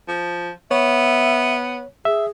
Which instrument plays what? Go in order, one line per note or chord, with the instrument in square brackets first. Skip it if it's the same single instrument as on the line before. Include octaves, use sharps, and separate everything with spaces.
[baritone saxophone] F3
[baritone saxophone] B3 [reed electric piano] C#5 [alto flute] E5
[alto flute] G#4 [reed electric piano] E5